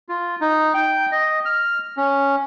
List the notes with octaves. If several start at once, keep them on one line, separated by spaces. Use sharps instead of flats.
F4
D#4
G5
D#5
F6
C#4